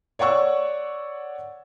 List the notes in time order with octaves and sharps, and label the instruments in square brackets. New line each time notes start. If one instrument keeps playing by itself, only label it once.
[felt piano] C#5 D5 F#5 C#6 E6